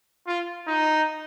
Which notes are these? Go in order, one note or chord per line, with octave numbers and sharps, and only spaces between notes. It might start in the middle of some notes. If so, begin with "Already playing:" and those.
F4
D#4